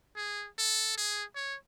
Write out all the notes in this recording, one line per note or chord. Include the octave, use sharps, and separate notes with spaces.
G#4
A4
G#4
C#5